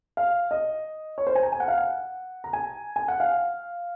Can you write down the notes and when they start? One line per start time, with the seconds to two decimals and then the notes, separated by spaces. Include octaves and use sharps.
0.17 F5
0.51 D#5
1.18 C#5
1.27 C5
1.35 G#5
1.43 A#5
1.52 G#5
1.60 F#5
1.68 F5
1.78 F#5
2.44 A#5
2.53 G#5
2.96 G#5
3.08 F#5
3.20 F5